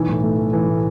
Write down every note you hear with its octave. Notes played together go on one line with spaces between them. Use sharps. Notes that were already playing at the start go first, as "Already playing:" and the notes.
Already playing: B1 E3
A2
A3
E3
E3
A2